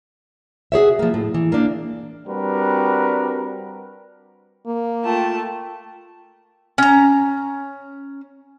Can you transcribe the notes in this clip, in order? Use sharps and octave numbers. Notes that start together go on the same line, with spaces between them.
F#4 G#4 C#5 E5
F3 A#3
A2
E3
A#3 D4
G3 C4 D4 F#4 A#4 B4
A#3
A3 F4 G5 A5
C#4 A#5